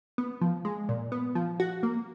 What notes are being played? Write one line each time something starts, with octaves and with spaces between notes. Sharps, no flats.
B3
F3
G#3
A#2
B3
F3
F#4
A#3